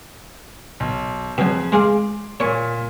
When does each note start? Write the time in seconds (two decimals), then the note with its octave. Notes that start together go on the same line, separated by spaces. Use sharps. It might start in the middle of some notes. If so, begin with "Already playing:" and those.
0.80 B1
1.38 F2 B2 F#3 G#4
1.72 G#3 G#4 F5 C6 D6
2.40 A#2 A#4 C#5 G#5 C#6